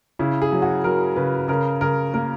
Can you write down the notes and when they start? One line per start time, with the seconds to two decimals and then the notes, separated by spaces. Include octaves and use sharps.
0.19 C#3 E4
0.42 G#4
0.52 F#3
0.62 F#4
0.84 F#3 A#4
1.16 C#3 B4
1.48 C#3 A#4
1.81 C#3 A#4
2.14 A#3 A#4